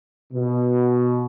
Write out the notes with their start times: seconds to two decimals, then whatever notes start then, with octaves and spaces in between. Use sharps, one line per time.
0.33 B2